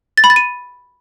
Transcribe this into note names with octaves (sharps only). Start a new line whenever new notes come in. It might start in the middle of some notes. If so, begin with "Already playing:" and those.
A6
B5
A6
D#7